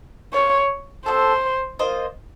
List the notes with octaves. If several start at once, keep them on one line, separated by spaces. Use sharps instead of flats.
A#3 C#4 F4 C5 C#5
C4 D#4 F#4 A4 C5
A#3 F4 C5 D#5